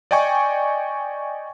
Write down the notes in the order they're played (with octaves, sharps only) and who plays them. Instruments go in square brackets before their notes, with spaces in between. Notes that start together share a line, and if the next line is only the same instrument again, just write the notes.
[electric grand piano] D5 D#5 G5 G#5 C#6